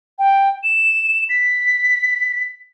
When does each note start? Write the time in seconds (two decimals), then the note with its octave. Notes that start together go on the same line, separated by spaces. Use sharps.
0.19 G5
0.64 E7
1.29 B6